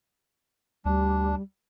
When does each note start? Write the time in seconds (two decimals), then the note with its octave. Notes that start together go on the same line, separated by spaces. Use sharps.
0.85 D2 G3 D4